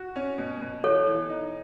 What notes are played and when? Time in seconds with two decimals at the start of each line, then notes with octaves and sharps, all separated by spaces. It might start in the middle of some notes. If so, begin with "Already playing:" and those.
Already playing: F#4
0.16 C#4
0.38 B2
0.61 B2
0.84 E3 A4 C#5
1.07 E3
1.29 D#4